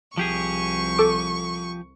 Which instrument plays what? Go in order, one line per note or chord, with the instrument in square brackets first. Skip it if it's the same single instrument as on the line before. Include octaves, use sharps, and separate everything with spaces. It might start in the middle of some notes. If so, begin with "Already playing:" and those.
[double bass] C2 [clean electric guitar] F3 G4 G#4 [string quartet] C#6
[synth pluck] A4 D6